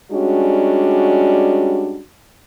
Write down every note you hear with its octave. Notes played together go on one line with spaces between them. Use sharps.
G3 G#3 C#4 D4 F#4